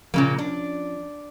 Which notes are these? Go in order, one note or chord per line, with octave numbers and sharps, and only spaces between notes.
A#2 C#3 F3 A#3 C#4
D4